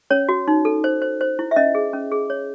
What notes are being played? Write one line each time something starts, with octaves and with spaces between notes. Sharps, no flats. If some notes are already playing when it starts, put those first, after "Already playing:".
C#4 C#5
F#4
D#4
A4
C5
C5
C5
E4
E5
C#4 D#5
G#4
C#4
G#4
C#5